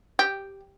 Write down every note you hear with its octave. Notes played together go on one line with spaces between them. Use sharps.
G4